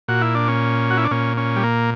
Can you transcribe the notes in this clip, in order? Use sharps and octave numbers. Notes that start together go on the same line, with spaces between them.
A#2 F#4
E4
D4
C#4
F#4
E4
D4
A#2 C#4
C#4
G3
A#3